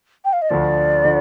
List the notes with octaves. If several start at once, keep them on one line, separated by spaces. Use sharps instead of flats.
G5
F5
D#5
D2 D3 F3 D5
D3 F3